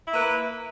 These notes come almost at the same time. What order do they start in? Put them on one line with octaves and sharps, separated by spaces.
E4 A#3 B4